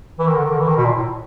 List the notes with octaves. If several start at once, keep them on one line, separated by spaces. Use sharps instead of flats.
E3
D#3
D3
D#3
D3
E3
D#3
B2
A#2
A2